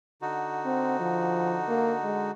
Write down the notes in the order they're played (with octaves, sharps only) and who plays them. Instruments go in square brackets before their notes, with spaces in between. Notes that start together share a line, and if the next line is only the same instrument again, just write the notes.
[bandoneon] D3 D#4 F#4
[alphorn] C4
F3
A#3
G#3